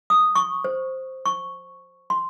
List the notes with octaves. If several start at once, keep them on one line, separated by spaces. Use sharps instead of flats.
D#6
C#6
C5
C#6
C6